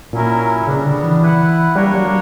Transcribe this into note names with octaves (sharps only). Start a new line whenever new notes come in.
A#2 F#3 C#4 E4 A#4
C#3 G3 B3 D4
D3
E3
E4 B4 F#5
G3 A#3 D4 A#4 C#5
F#3